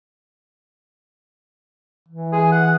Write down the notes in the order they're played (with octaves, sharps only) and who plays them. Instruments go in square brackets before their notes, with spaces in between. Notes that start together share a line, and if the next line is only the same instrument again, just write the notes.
[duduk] E3
[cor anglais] G#4
F#5